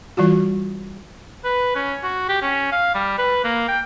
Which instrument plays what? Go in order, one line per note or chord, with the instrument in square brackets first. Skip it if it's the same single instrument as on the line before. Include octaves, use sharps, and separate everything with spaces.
[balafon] E3 G3 F4 F#4
[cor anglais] B4
C#4
F#4
G4
C#4
F5
G3
B4
A#3
G5